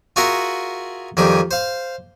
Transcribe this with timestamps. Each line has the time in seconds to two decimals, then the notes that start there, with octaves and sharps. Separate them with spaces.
0.16 F4 F#4 G#4 A#4 E5 F#5
1.17 F2 D#3 G3 G#4
1.51 C5 F5